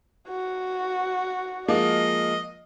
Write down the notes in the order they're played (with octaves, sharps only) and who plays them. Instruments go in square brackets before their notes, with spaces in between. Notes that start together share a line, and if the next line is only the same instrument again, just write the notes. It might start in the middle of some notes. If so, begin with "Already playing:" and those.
[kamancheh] F#4
[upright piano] F3 G#3 A#3 [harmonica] D#5